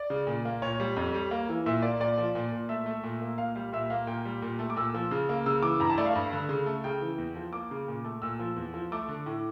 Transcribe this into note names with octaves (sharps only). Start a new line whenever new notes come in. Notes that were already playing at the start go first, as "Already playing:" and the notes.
Already playing: D5
C#3
A#2
A#3
A#2 C#5
G3
F2
G3
A#3
E3
A#2 E5
A#3 D5
A#2 D5
F3
A#2
A#2
A3 E5
A3
A#2
A#3
A#2 F5
G3 F5
A#2 E5
A#3 F5
A#2 G5
G3
A#2
A3
D6
A#2 E6
F3
C#3
A#3
C#3 E6
E3 D6
G2 A#5
A5
A3 D5
F5
G2
D3
C#3
A3
C#3 G5
E3
E2
F3
A#3 D6
C#3
A#2
A3
A#2 E6
F3
E2
F3
A3 D6
D3
A2